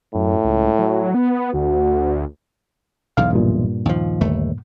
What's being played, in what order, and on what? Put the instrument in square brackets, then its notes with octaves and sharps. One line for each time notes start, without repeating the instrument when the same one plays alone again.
[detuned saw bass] F#2 [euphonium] A2
[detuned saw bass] C#2
F#3
B3
[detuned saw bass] D2 [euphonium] F#4
[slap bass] B1 E2 G#2 [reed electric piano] F5
[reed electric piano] G2 A#2
[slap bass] D#2 F3
G1 D#2 A3